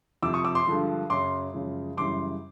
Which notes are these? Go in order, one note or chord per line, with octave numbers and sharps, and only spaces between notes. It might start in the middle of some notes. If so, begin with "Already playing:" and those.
F2 C3 F3 D6 E6
C#6 D#6
D6 E6
C6 D6
G2 D3 F3 G#3
F#2 C#3 F#3 C6 D6
F#2 C#3 F3 G#3
F#2 C#3 E3 G3 C6 D6